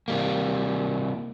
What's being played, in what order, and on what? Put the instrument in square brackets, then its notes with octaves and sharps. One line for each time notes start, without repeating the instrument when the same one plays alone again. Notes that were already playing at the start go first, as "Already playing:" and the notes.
[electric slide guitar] C3 G3 A#3